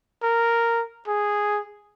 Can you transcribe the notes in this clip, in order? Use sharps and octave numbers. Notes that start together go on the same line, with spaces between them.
A#4
G#4